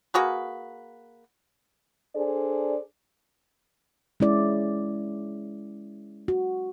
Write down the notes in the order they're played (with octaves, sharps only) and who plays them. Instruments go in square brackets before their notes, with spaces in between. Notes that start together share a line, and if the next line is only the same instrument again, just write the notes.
[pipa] A#3 F#4 G#4 B4
[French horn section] D4 G#4 A4 C5 D5
[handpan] G#3 C#4 E4 D5
F#4